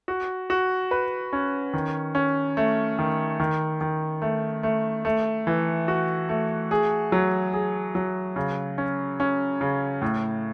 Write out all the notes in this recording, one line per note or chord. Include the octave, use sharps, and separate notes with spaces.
F#4
F#4
B4
C#4
D#3
C#4
A3
D#3
D#3
D#3
A3
A3
A3
E3
F#4
A3
G#4
F#3
G#4
F#3
C#3
C#4
C#4
C#3
A2